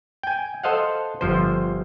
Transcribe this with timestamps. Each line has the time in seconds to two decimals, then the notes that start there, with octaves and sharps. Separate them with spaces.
0.23 G5 G#5
0.64 A4 C5 D#5 F5 F#5
1.21 G1 F3 C5